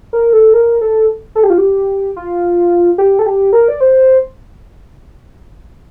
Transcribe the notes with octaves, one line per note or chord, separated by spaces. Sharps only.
A#4
A4
A#4
A4
A4
G4
F4
G4
F4
G4
A4
G4
A#4
D5
C5